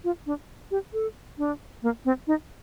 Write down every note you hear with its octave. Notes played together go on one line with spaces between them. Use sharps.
F4
D4
G4
A4
D4
A#3
C4
D#4